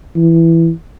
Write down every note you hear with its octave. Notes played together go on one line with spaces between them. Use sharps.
E3